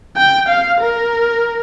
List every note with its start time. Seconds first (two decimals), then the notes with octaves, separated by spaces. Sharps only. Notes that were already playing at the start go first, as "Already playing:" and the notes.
0.16 G5
0.49 F5
0.80 A#4